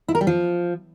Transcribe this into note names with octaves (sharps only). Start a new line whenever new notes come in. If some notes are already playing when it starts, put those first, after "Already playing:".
E4
A#4
G3
F3